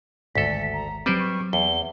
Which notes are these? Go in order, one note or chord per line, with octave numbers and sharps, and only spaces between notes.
G#1 D2 G#2 A4 B6
A#5
F#3 G3 C4 B4 C5 D7
C#6
E2 G7